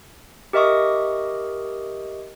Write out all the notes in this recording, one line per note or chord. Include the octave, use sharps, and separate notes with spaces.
G4 A#4 D#5 E5 C#6 D#6